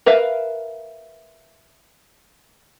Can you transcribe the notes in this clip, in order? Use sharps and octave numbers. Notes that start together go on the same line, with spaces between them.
A#4 B4 E5 F5